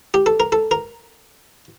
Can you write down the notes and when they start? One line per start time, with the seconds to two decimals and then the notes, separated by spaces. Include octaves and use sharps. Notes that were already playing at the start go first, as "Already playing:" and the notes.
0.14 G4
0.26 A4
0.40 A#4
0.52 A4
0.71 A#4